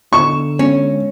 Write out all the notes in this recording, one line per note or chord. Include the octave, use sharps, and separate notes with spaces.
D3 B3 A#5 C#6 E7
G#3 B3 C#4